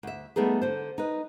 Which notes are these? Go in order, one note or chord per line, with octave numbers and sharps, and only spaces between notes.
D2 E5
G3 A3 B3 D#4 G#4
D3 C5
D#4 B4